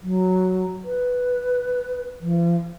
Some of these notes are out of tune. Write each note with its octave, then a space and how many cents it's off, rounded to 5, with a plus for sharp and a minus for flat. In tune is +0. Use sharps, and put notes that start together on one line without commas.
F#3 +0
B4 +0
F3 -40